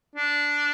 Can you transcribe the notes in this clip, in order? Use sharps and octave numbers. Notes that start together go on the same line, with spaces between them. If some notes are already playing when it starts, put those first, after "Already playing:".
D4